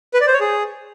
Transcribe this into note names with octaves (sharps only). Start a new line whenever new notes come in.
B4
D5
C5
C#5
G#4